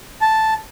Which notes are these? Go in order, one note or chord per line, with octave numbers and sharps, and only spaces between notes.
A5